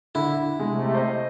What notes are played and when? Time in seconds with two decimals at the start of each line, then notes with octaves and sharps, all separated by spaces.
0.15 D3 E4
0.60 C3 G#3 A3
0.94 C5 D#5